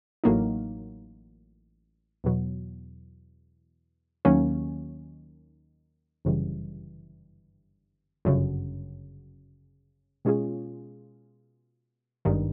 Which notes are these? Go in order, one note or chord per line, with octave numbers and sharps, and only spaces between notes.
A1 A2 F#3 A#3 D#4
E2 B2 F#3
D#2 D#3 F#3 A#3 C#4
G1 F#2 C#3 E3 G3
G1 F#2 C#3
B2 G#3 C#4 F4 G#4
G#1 G2 D#3